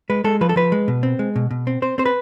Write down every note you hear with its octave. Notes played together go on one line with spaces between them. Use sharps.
G#3 B4
G#3 A4
F3 B4
A4
F3 B4
G#3
B2
C4
G#3
B2
B2
C4
C4 C5
C4 C5
B4